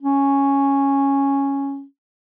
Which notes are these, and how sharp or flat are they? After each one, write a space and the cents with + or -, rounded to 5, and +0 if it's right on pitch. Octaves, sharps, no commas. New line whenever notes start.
C#4 -5